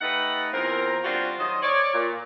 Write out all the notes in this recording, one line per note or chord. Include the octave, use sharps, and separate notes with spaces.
A3 D#4 G4 B4 F#5
E2 C4 F4 A#4
G3 C4 D4 F4 F#4
D#3 F#3 C5 D#5
C#5 D5
A#2